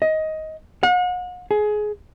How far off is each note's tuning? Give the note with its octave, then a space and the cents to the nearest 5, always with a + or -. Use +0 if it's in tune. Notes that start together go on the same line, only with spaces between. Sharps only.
D#5 +15
F#5 -40
G#4 +20